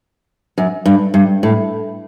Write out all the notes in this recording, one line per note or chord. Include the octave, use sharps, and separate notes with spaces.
F#2
G2
G2
A2